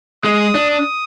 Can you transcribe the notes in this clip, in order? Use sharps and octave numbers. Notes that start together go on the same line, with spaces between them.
G#3 D#6
D4
D#6